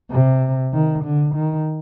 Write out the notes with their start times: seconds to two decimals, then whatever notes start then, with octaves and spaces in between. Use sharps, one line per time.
0.11 C3
0.74 D#3
1.04 D3
1.35 D#3